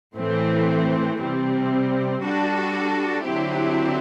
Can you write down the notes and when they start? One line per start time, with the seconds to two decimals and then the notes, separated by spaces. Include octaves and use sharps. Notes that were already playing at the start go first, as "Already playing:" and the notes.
0.16 A2 E3 A3 C4
1.19 C3 G3 C4
2.22 G3 D4 F#4 A4
3.25 D3 F#3 C4 E4 G4